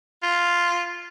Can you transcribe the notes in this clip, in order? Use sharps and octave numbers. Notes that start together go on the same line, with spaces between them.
F4